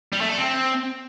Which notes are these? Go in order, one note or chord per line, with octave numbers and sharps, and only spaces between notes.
G3
A3
A4
C4